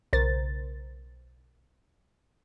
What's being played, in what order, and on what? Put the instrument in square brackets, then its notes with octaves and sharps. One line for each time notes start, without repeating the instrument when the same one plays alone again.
[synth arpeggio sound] B1 C#3 A#4 C5 A6